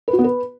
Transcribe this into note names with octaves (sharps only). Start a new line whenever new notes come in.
B4
F#4
B3
B4